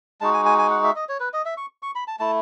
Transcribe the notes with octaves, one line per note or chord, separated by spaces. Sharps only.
G#3 D#4 F#4 A5
G#5
G#5
G#5
F#5
E5
D#5
C#5
B4
D#5
E5
C#6
C#6
B5
A5
A3 E4 A5